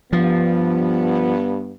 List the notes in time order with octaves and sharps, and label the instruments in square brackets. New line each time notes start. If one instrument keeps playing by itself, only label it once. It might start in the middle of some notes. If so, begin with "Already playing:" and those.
[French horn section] G2 B3 [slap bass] F3